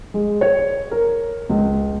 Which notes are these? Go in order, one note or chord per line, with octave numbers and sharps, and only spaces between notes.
G#3
C#5
A#4
C#2